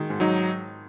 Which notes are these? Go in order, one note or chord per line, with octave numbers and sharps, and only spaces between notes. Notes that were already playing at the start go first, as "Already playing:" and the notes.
Already playing: D#3 G#3
G#2
F#3 D#4